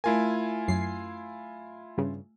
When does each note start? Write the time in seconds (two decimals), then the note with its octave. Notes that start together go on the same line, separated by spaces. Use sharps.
0.04 A3 E4 F4 A#4 G#5
0.68 F#2 C7
1.98 G2 C#3